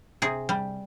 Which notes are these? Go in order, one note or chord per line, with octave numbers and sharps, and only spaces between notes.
C3 G#4
G3